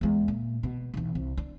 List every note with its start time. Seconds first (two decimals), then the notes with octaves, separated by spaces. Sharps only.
0.01 E2 G#3
0.28 A#2
0.63 B2
0.94 B1 E2
1.15 C2
1.38 D4